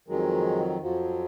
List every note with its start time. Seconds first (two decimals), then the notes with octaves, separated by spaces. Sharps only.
0.08 F2 D#3 F#3 G#3
0.81 F2 F3 F#3